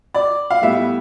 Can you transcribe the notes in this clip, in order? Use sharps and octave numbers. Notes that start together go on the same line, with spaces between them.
D5
F5
A2 G3 B3 E5